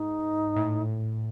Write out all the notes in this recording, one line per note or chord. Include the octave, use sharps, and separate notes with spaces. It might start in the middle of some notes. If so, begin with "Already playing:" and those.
Already playing: G#2 D#4
A2